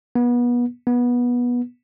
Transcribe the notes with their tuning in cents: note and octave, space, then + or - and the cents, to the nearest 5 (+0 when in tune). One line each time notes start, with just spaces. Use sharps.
B3 -30
B3 -20